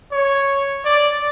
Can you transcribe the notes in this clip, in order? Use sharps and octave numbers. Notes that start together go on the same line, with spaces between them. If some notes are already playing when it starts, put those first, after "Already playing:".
C#5
D5